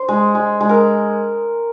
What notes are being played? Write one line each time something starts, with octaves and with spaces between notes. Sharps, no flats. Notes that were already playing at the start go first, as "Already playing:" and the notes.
Already playing: C5
G#3
G#3
G#3
A#4